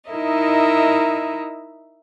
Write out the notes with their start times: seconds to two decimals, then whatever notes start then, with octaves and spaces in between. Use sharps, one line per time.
0.10 D#4 E4 A#4 D#5 E5